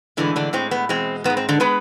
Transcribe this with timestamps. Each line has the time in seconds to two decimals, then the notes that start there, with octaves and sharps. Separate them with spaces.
0.17 A2 D3 E3 G#3 D4
0.36 D3 D4
0.53 A2 G#3 C4
0.71 B3
0.89 E2 B2 G#3 C4
1.24 G#2 B3
1.30 G#3
1.37 C4
1.49 D3 D4
1.60 G#3 B3 B4